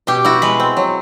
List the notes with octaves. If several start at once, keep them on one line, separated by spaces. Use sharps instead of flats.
B2 G4
E4 F#4
G#3 B4
C4
F#3